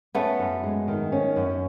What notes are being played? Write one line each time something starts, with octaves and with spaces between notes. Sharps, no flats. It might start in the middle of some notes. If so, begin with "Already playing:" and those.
A3 B3 C#4
F#2
G#3
D#3
C#4
F#2